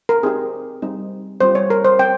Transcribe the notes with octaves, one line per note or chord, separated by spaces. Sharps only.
A#4
C4 D#4 G4 G#4
G3 C4 D#4
G3 C4 F4 C5
C#5
A#4
C5
C4 G5